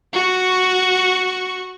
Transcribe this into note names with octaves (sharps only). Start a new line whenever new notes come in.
F#4 C#6